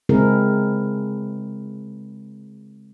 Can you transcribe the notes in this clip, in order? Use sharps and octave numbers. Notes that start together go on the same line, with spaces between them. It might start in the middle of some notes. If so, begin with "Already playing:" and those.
C#3 G#3 C4 E4 G#4 A#4